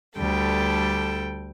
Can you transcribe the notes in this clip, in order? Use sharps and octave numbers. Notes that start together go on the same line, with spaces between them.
D2 G3 A4 G5